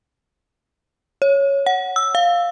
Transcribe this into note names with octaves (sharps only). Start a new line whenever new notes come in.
C#5
F#5
E6
F5